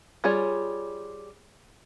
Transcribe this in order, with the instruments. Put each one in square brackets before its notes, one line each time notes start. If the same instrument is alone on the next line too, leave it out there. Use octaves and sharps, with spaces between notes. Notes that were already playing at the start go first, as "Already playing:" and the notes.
[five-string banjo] G3 F4 G#4 C#5 D5